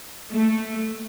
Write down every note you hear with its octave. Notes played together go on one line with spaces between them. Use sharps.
A3